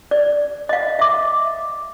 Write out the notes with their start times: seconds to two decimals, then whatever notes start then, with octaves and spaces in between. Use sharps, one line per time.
0.11 D5
0.69 D#5 F5
0.99 E5 D6